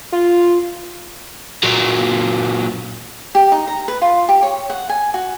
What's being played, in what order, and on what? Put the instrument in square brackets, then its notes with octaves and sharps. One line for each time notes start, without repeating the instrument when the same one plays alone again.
[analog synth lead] F4
[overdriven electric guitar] A#2 F#3
[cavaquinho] G4
D#4
A#5
B4
F4
G4
C#5
F#5
G#5
F#4